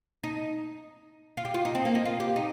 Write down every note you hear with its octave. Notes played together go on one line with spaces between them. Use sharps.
D#4
F4
G4
F4
D#4
C4
A#3
D#4
F4
G4
D#4